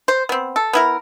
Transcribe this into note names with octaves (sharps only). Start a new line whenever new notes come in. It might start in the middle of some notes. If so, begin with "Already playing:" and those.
C5
B3 C4
A4
B3 E4 A#4